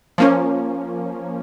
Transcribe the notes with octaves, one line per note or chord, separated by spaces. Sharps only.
F3 A#3 C#4